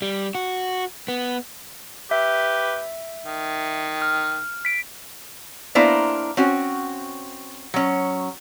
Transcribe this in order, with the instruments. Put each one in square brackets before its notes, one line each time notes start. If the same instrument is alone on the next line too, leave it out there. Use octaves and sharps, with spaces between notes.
[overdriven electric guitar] G3
F#4
B3
[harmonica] G4 B4 [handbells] E5
[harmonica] D#3
[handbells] F6
B6 D7
[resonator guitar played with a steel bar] A#3 B3 D4 E4 A#4 C5
C4 C#4 F#4
F#3 C#4